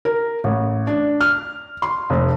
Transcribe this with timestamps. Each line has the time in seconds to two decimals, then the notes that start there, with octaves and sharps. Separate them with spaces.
0.05 A#4
0.44 A1
0.87 D4
1.21 F6
1.82 C6
2.10 F1